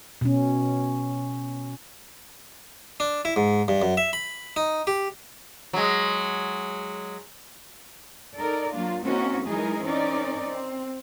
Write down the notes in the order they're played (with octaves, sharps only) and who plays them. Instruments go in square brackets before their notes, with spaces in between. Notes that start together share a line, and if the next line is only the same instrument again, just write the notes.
[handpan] B2 C#4
[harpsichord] D4
E4
G#2
G2
F#2
E5
B5
D#4
G4
[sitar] F#3 G#3
[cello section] D#4 A4 A#4 D5
F#3 A#3 D4 F4
A#3 C4 C#4 D#4 E4 F#4
E3 F#3 G#3 D#4 G#4 A#4
C4 C#4 D#4 A#4 D5
C4